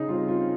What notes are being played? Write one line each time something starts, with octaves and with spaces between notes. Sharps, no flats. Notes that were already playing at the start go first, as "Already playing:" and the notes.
Already playing: C#3 D#4 G#4
G3 C4 F4
F4